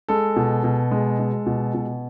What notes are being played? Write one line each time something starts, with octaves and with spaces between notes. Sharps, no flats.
G#3 A4
B2
B2
G#3
G#3
B2
B2